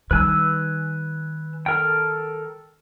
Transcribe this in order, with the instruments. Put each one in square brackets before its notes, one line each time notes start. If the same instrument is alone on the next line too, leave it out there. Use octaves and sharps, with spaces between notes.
[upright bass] D#3 G3 [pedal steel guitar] B4 G#5 E6
[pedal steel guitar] A4 A#4 G5